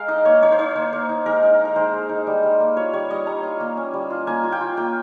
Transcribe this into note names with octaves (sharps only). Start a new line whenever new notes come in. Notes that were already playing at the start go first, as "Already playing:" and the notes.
Already playing: G#3 A#4 F5
D#4 D#5
A#3 C#5
D#4 C#5
C5
D#4 C#5
A#3 C5
A#3
D#4
G#3 A#4
D#4
D#4
A#4
G#3 C5
G#3
D#4
G3
G3
A#3
F4 C#5
G3 C#5
G3 D#5
G3 A#5
F4
A#3
C#4
G3
F4
A#3 G#5
F4
G5
F4
A#3 G5